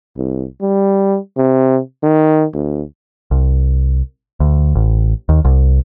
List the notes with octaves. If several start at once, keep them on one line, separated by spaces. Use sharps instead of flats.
C2
G3
C3
D#3
D2
C2
D2
A1
D#2
C2